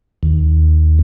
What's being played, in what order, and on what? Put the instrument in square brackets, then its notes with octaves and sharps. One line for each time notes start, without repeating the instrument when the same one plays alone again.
[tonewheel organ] D#2